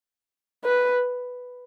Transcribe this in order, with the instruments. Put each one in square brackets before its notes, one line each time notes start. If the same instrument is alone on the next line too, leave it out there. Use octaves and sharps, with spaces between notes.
[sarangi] B4